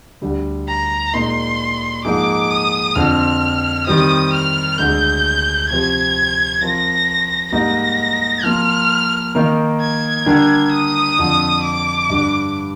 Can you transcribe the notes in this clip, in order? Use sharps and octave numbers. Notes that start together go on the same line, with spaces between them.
D2 D3 G3
A#5
A#2 G#3 D#4 A#4 C6
G#2 F3 A#3 D#4 G#4 D6
D#6
F2 D3 F3 C4 F6
D#3 G3 C4 D#6
F6
D2 D3 G#3 G6
C3 F3 C4 G4 C5 G#6
F3 C4 F4 A#4 A#6
G#2 G3 A#3 D#4 A#6
F3 A#3 F4 F6
D#3 A#3 D#4 A#4
G#6
D3 G3 D4 G4 A#4
D#6
F2 D3 F3
D6
G2 D3 G3 D4